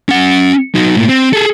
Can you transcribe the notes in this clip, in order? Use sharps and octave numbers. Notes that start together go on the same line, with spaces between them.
C#4 F#5
F#3 D#4
A2 A#3
C4
G#4 A4